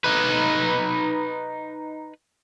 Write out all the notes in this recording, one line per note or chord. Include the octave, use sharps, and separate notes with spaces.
D#4 B4